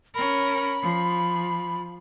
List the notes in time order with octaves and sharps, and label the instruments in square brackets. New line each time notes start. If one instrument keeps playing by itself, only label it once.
[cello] C#4 A#4 [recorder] B5
[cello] F3